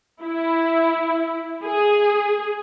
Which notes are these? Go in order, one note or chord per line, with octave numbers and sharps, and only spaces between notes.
E4
G#4